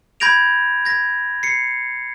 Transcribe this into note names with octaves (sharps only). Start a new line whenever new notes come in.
B5 G6 G#6 A#6 D7 F7
G#6 A#6
C7 C#7